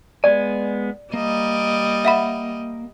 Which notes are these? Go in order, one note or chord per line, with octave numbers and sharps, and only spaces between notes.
G#3 B3 D5 G#5
G3 A#3 D#5
E5 F#5 B5